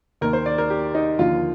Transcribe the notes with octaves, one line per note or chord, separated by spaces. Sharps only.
D#2 D#3 A#4
C5
D5
A#4
G4
D#4
D#2 D3 F3 F4